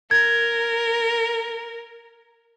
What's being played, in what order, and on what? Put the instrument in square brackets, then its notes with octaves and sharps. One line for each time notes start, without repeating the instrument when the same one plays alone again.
[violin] A#4 [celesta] G#6